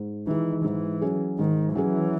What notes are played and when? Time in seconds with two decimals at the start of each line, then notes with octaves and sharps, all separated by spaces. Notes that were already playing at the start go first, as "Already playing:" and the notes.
Already playing: G#2
0.27 D#3 E3 G#3
0.64 G#2 E3
1.01 F#3 C#4 G#4
1.39 G#2 D#3
1.75 E3 F#3 C#4 G#4